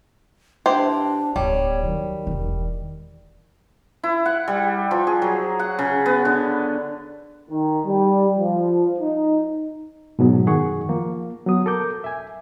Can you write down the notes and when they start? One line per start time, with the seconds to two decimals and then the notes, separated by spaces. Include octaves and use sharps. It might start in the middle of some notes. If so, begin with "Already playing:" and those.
0.66 E3 D4 G4 C5
1.36 D1 G3 B3 C#5
1.84 D#3 F#3
2.27 E1 E3
4.03 E4
4.26 F#5
4.48 G3
4.91 F3
5.07 G#4
5.22 F#3
5.59 F#5
5.79 C#3
6.06 B3
6.25 D3
7.49 D#3
7.85 G3
8.38 F3
8.98 D#4
10.19 G#2 B2 F#3 B3
10.47 F#2 D#3 G#4 F#5 C#6
10.89 F3 A#3
11.46 F#3 B3 D#6
11.66 A4 A#4 D6 G6
12.04 E5 G#5